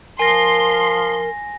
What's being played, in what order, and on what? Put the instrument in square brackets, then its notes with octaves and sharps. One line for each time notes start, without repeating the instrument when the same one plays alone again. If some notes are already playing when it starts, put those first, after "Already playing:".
[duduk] F3 [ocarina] A#4 [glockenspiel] G#5 A#6 [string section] C6